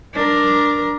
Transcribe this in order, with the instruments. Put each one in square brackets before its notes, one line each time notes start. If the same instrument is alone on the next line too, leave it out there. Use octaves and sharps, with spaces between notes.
[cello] D4 A#4